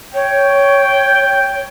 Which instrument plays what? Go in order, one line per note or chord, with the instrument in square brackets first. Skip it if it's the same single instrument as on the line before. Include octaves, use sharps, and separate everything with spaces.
[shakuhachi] C#5 [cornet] G5